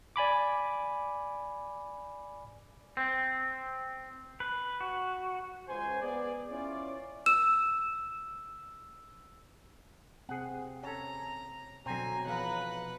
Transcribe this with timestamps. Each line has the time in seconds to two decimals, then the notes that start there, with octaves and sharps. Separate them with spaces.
0.16 D5 G#5 B5 D6
2.97 C4
4.40 B4
4.81 F#4
5.68 C#2 C5 G#5
6.02 B3 G#4 D5
6.48 C#4 E4 F4 D5
7.26 E6 E7
10.29 C3 C4 G#4 F#5
10.83 C#4 A4 A#5
11.86 B2 D3 F#3 C4 G#5 A#5
12.26 B1 E3 F3 B4 F5 F#5